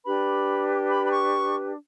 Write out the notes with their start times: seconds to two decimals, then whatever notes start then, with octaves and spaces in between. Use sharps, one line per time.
0.04 D4 G4 B4 B5
0.90 B5
1.06 B5
1.11 C#6